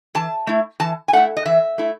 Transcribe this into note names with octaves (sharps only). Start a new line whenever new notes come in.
E3 A5
A3 E4
E3 A5
G#5
A3 E4 F#5
D#5
E3 E5
A3 E4